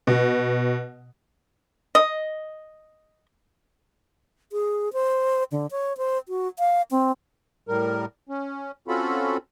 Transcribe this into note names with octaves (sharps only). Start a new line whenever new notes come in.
B2
D#5
G#4
C5
D3
C#5
C5
F#4
F5
C4
A2 G3 A#4
C#4
C4 C#4 F4 F#4 A4 B5